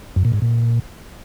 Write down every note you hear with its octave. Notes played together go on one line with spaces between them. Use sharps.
F#2
A#2
G#2
A#2